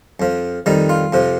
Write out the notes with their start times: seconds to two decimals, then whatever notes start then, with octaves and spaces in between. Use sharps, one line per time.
0.20 F2 F3
0.66 F2 D#3 G3 D#4
0.89 F4
1.12 F2 C3 F3